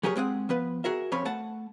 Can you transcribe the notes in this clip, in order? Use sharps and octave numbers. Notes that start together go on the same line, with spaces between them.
F#3 G4 G#4 A#4 C#5
G#3 C4 G#4 F#5
F3 B3 B4
F#4 G#4 A#4 E5
F2 C4 C#4 C#5 B5
A3 F#5 A5